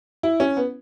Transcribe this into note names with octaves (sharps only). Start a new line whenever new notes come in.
E4
C#4
B3